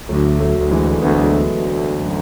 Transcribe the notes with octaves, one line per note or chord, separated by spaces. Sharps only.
D2 F#3 A3
F#3 A3
D2
E3 G#3
D2 B3
A3
G#3
F#3 A3
D2
F#2